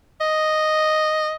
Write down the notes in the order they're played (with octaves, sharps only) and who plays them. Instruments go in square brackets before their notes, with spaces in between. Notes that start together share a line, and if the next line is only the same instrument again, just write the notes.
[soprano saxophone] D#5